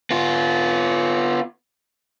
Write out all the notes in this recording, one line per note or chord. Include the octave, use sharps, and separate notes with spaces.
B3 F4